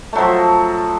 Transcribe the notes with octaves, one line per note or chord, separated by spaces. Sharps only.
F3 F#3 A3